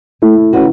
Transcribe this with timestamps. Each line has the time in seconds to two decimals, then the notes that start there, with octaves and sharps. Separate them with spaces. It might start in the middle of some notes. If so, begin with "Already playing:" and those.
0.22 A3 E4
0.53 C#4 F#4 B4